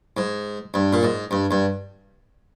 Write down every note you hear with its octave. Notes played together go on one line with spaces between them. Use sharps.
G#2
G2
A#2
G#2
G2
G2